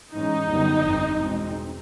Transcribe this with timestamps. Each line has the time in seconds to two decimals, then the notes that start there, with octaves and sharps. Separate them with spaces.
0.12 G#2 E3 G#3 C#4 D#4
0.48 F#2 D3 G3 B3
0.84 G1 F2 D3 G3 C4
1.20 E2 B2 G#3 C4